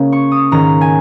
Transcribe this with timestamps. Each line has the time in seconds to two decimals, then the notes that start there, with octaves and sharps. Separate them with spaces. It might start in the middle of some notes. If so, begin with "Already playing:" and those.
Already playing: C#3 A#3 C#4
0.12 C#6
0.31 D#6
0.51 G#2 D#3 C#4 A#5
0.81 G#5